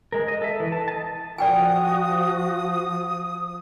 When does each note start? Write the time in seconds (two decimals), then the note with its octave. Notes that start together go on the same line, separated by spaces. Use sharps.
0.12 G#3 A#4
0.28 D#5
0.42 A4 E5
0.60 E3
0.72 A5
0.88 D#5 A5
1.38 F3 F#4 D5 G5 G#5 D#6